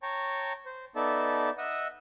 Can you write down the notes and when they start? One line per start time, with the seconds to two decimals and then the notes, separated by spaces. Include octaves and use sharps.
0.03 C#5 G5 A5 A#5 C#6
0.66 C5
0.96 B3 D#4 A4 D5 E5 A5
1.58 D#5 E5 F#5 D#6 E6